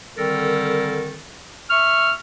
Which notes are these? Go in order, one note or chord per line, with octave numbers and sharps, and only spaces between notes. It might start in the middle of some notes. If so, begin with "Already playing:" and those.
D3 D#3 G3 C4 A4 A#4
E5 C#6 F6